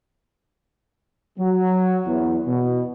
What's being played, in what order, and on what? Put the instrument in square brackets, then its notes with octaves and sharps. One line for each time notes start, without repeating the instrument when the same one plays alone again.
[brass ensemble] F#3
E2
B2